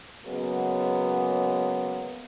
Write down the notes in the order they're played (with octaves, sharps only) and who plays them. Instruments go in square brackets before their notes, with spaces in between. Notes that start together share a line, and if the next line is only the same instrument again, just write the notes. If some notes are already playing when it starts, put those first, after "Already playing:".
[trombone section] C#3 F#3 G#3 A#3 B3